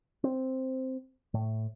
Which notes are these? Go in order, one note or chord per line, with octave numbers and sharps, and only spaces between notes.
C4
A2